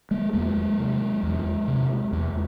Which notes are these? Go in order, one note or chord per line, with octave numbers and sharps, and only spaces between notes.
G#3 A#3
E2 G#3 A#3
C3
E2
C3
E2